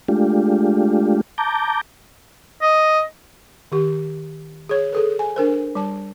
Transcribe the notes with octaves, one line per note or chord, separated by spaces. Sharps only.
G#3 A3 D4 F4 G4
A5 A#5 D6 G6
D#5
D#3 G4
G#4 C#5
G#4 A4 B4
G#5
D4 A#4 C5
G3 A5